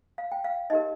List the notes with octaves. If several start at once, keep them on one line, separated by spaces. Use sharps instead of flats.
F5
G5
F5
D#4 G4 A#4 D#5